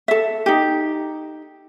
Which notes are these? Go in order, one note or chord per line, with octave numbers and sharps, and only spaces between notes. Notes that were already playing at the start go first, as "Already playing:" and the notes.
A4 E5
D#4 G4